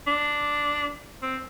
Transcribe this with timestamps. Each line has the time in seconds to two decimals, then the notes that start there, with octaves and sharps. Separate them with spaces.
0.07 D4
1.22 C4